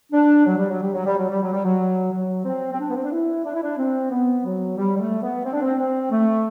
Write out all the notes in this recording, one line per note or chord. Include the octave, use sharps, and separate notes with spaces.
D4
F#3
G3
F#3
G3
F#3
G3
F#3
G3
F#3
G3
F#3
F#3
C4
C4
D4
B3
C4
D4
E4
D4
E4
D4
C4
B3
F#3
G3
G3
A3
B3
C4
D4
C4
C4
A3